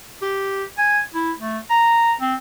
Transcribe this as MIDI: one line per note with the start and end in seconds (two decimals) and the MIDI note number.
0.22 0.64 67
0.78 1.01 80
1.14 1.32 64
1.40 1.59 57
1.70 2.13 82
2.21 2.35 60